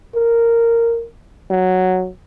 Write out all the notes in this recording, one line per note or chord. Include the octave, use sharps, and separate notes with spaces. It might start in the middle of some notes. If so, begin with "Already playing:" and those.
A#4
F#3